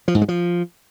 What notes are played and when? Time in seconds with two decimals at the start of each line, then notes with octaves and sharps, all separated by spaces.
0.08 F3
0.15 G#2
0.22 G#3
0.28 F3